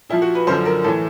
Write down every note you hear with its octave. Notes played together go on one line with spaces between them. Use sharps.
A#2 F3 E4
F#4
B4
F#2 D3 F3 C5
A#4
A2 E3 A4